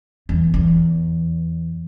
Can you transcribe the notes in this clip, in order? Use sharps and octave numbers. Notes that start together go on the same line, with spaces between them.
E2
E2